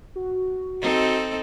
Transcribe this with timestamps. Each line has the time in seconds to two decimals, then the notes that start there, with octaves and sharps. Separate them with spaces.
0.16 F#4
0.81 C4 D#4 A4